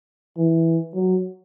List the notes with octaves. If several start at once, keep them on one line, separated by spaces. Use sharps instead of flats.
E3
F#3